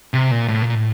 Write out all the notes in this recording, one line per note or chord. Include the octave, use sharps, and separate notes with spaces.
C3
A#2
A2
A#2
A2